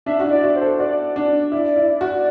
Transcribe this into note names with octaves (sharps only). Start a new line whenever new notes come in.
D4 E5
F#4
E4
D5
F#4
C5
A4
F#4 D5
D4
E4
E4
F#4